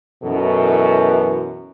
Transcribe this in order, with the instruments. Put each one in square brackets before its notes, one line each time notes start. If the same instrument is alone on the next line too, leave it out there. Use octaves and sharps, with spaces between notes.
[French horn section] F#2 B2 E3 A4